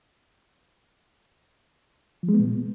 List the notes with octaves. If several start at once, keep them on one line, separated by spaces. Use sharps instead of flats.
F3
G#3
B3
A#2